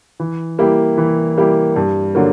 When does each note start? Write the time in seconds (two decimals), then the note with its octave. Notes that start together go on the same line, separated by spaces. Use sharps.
0.20 E3
0.59 G3 A#3 E4 G4
0.98 E3
1.37 G3 A#3 E4 G4
1.76 G2
2.15 D3 F#3 A#3